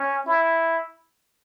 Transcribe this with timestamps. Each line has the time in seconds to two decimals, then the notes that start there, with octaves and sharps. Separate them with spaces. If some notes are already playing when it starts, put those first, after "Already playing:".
Already playing: C#4
0.26 E4